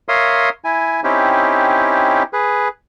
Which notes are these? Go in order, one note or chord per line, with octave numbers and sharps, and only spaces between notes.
A#4 C#5 E5 F5 C6 D#6
E4 G#5
C4 C#4 D#4 E4 G4
G#4 B4